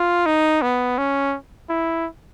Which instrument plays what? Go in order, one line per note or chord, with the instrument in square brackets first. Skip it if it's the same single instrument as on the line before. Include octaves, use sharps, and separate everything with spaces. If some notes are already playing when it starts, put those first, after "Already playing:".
Already playing: [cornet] F4
D#4
B3
C#4
E4